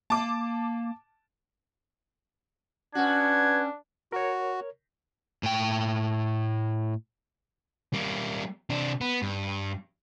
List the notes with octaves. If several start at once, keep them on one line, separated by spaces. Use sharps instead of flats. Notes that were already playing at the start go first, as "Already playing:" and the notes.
A#3 A5 D6
B3 C#4 D4 F#4 G#6
F#4 A#4 C#5
A2 G5
G3 A#3
C3 D4
B3
G2